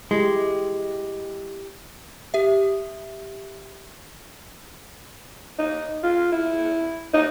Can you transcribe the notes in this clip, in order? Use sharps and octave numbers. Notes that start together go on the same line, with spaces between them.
G#3 E4 G4
G4 E5
D#4
F4
E4
D#4